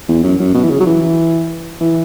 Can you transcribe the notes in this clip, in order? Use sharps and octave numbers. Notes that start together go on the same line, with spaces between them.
E2
F#2
F#2
B2
E3
C#3
F#3
E3
E3